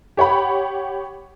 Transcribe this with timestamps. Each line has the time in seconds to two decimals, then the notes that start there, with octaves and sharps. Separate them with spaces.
0.17 G4 C#5 F#5 B5